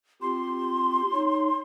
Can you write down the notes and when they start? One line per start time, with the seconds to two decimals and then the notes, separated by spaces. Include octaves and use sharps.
0.22 C4 F4 G4 C6
1.12 D#4 C#5